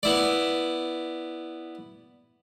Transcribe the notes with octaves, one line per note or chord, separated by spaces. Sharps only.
B3 E4 D5